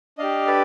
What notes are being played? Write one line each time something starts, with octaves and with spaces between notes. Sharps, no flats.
D4 G4 D#5 F5
A4 B4